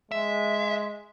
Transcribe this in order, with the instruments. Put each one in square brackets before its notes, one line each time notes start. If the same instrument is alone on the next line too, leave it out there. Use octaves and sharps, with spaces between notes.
[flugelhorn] G#3 [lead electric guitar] E5